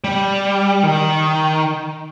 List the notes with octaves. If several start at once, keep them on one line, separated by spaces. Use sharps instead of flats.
G3
D#3